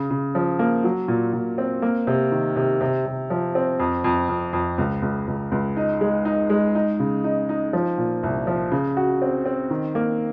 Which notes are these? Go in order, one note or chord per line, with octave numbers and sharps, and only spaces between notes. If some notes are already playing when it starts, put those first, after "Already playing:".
Already playing: C#3
C#3
F3
A#3
F#3
A#2
A#2
C4
A#3
C3
D#3
C3
C3
C3
F3
C4
F2
F2
F2
F2
C#2
C#2
C#2
C#2
D#4
G#3
D#4
G#3
D#4
C#3
D#4
D#4
F3
A#2
C2
F3
C#3
F#4
C4
C4
D#3
A#3